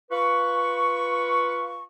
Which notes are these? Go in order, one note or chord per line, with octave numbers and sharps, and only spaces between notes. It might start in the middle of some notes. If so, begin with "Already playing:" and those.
F4 B4 C#6